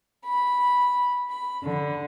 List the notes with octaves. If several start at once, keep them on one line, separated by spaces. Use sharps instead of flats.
B5
B5
D3